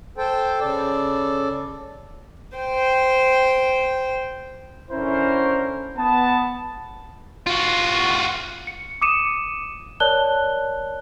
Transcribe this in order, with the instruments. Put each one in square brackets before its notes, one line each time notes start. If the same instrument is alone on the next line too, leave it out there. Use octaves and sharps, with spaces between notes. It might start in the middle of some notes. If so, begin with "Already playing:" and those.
[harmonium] A4 C5 G5
C#3 A4 D5
[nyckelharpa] C5 G5
[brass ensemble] D3 C#4 E4 A#4 C5
B3 A5
[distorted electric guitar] F4 F#4
[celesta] C#7
D6 D#6 C#7 D#7 E7
A#4 C#5 D5 A5 F#6 G7